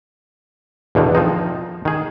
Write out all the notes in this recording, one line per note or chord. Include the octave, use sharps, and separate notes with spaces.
E2 B2 D3 D#3
F3 C4 D#4
D#3 G#4